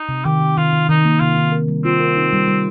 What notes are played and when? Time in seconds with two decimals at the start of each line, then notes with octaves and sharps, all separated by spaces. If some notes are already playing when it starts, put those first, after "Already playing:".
Already playing: D#4
0.09 C3
0.25 D#3 G4
0.41 D#3
0.57 D#3 F4
0.73 D#3
0.89 D#3 D#4
1.05 A#3
1.20 C3 F4
1.37 D#3
1.52 A#4
1.68 G3
1.85 C4 F4
2.00 A#4
2.17 D#4
2.33 G3
2.48 G3